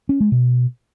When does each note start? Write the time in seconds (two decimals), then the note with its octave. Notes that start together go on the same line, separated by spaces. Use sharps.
0.09 C#4
0.20 G#3
0.32 B2